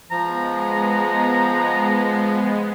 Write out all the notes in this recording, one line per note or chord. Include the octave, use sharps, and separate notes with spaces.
F3 G#3 B3 A#5